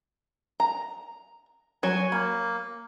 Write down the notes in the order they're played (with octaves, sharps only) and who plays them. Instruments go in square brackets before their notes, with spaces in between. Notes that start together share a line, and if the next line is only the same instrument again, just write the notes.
[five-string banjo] A#5
[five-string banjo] F#3 C#5 [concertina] G#5
[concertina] A#3 [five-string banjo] B5